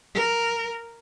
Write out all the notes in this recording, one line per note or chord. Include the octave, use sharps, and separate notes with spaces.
A#4